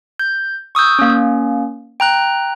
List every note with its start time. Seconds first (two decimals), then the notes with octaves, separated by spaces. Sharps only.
0.19 G6
0.75 C#6 D#6 E6 G6
0.99 A#3 C#4
2.00 G5 A#5 F#6